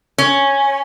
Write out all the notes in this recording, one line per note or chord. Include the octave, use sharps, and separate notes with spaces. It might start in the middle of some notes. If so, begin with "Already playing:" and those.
C#4